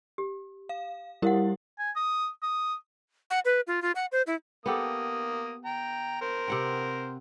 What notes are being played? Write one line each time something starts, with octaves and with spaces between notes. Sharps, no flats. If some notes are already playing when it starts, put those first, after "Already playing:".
G4
F5
G3 E4 G4 A#4 F5 F#5
G#5
D#6
D#6
F#5
B4
F4
F4
F#5
C5
E4
A#3 B3 G4 A4 D#6
G5 A#5
A#4 C5
C3 F#5 G5